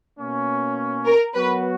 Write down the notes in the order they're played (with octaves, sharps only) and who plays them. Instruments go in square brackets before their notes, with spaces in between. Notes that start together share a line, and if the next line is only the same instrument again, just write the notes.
[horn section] B2 A#3 C#4
[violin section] A#4
[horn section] F#3 B3 F#4 [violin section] B4